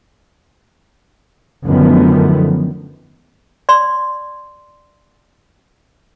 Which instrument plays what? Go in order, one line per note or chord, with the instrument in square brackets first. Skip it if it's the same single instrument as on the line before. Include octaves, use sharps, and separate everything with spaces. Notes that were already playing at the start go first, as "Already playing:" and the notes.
[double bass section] F#2 D3 D#3 F3 A3 B3
[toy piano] D5 C6